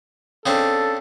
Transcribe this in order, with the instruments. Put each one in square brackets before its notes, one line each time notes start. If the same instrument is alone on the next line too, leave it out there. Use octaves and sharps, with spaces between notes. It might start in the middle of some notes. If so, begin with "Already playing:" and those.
[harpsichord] C#3 C4 D4 [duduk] A4